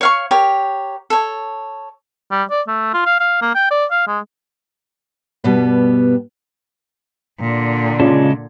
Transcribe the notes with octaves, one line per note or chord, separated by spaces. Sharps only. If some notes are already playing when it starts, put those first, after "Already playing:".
C#5 F5 C#6
G4 A#4 C#5
A4 C#5
G3
D5
A3
F4
F5
F5
A#3
G5
D5
F5
G#3
G2 B2 G3 B3
A#2 D3
C#3 G#3 C#4 F4 D5 A5